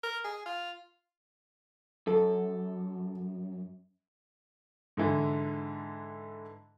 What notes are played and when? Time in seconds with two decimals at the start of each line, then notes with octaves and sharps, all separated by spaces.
0.03 A#4
0.24 G#4
0.46 F4
2.07 F#2 A4
4.97 G#2 D3 E3